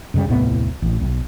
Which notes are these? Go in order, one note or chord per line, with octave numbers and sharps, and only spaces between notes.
F#2 C#3 G3
D#1 C2 A2 B3
A1
B1